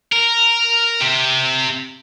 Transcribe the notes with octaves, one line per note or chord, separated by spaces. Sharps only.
A#4
C3